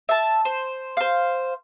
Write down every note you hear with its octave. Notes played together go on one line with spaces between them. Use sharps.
E5 A5
C5
C5 F5